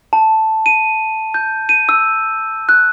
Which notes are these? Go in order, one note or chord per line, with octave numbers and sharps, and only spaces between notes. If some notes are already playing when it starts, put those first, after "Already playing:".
A5
D#7
G6
D#7
E6
F#6